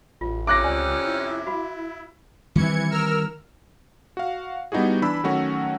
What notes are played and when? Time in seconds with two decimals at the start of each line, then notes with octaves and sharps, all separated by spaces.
0.21 A1 F4
0.47 F2 C3 C#4 E5 D6 F#6 A#6
0.64 C#2 D5 G#5
1.05 E4
1.47 F#4 F5 B5
2.55 D#3 E3 G3 C4 G#6 C#7
2.90 A#4 E6 F6
4.17 F#4 F5
4.72 G3 B3 D#4 E4 F#4 G#4
5.02 E3 D4 B5 E6
5.24 D#3 F#3 A3 C#4 F#4